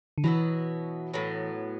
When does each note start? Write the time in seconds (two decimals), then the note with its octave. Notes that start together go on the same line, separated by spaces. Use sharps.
0.18 D3
0.24 B2 E3 F#3 B3 E4
1.14 A2 F#3 B3